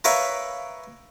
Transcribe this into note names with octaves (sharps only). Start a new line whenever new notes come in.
A#4 B4 C#5 E5 F5